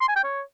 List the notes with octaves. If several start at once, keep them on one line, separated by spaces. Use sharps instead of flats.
C6
G#5
G5
C#5